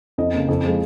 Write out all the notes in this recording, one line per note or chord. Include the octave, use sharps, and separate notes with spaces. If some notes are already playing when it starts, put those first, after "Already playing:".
F2 D#5
C#3 A#3
F2
F3 G#3